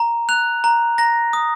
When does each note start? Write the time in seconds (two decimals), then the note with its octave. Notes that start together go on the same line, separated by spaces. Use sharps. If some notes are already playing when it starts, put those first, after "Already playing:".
Already playing: A#5
0.29 F#6 F7
0.64 A#5
0.98 A#5 A#6
1.33 D#6